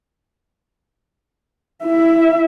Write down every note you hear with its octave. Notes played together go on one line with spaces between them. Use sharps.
E4 E5